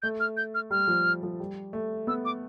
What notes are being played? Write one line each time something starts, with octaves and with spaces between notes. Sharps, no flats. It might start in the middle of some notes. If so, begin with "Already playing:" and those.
A3 G6
F6
G6
F6
G3 F6
F3
F3
G3
A3
B3 E6
D6